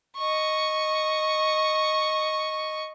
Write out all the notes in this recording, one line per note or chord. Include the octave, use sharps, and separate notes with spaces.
D#5 C#6